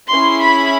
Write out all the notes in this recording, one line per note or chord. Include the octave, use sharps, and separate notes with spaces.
C#4 E4 G#4 C6
B5